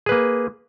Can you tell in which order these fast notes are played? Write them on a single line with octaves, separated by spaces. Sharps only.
G#4 B4 A#3